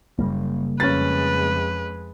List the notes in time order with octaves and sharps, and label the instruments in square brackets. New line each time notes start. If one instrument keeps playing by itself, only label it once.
[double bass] F#1 [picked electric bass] C#3 G3 A#3
[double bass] F2 G#3 [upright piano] C#4 A6 [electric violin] B4